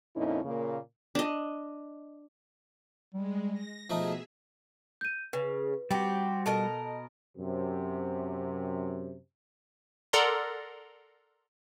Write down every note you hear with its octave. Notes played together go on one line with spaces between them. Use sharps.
F2 A#2 C#4 D#4 E4
A#2 C#3 A#3
D4 D#5
G3 G#3
A#6
B2 F3 A3 B3 D#4 G#4 E5
G6 D#7
C#3 B4
G3 C4 F#4 G4
B2 A4 A#4 D#5 A5
F#2 C3
A4 A#4 D5 F#5 A#5 C6